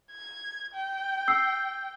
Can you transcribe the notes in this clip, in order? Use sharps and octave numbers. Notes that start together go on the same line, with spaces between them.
G#6
G5
E6 C7